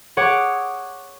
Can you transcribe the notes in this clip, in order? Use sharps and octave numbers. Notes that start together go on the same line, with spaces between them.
G#4 C#5 F#5 D6 G#6